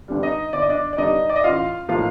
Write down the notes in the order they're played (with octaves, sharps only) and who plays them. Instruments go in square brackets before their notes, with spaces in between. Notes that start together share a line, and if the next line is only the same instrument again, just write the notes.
[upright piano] G2 D3 G3 D4
D#4 D#5
G1 D5
D#5
D4 D5
D5
G2 D3 G3 D4 D#4 D#5
D5
D#5
A1 F4 F5
A2 F3 A#3 D#4 F4 F5